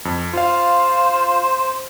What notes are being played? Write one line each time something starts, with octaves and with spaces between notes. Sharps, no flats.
F2
F4 C5 F5